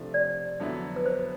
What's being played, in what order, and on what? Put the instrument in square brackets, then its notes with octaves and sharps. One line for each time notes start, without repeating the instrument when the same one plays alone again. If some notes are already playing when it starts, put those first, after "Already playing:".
Already playing: [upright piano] C3 F3 A3 D4
[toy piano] D5
[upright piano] F2 D3 F#3 B3 E4
[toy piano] B4
C5